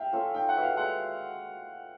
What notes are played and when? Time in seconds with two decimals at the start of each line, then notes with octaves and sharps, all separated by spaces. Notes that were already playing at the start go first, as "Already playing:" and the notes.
Already playing: E5 F5 G5
0.12 C#4 F4 A4
0.34 D#4 G5
0.49 F#5
0.55 F#4 B4 E5
0.63 F5
0.77 G#3 F#5